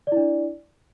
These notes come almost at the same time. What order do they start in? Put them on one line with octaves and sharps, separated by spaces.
D5 E4 D4